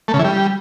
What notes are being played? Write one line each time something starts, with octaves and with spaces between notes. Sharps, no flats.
A3
C#3
E3
G3